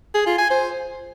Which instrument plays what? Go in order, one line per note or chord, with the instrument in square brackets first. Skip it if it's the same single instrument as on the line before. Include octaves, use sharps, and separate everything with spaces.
[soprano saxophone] G#4
F4
G#5
C5